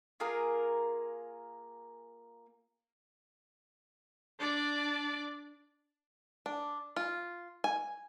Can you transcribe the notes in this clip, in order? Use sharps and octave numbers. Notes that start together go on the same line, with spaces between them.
A#3 F4 G#4 A#4
D4 D5
D4
F4
G#5